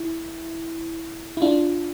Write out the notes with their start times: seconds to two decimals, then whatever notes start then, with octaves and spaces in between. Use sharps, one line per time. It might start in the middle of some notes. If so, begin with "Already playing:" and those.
Already playing: E4
1.37 E4
1.42 D4 F4